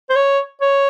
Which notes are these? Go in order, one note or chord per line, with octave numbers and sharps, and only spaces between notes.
C5
C#5
C#5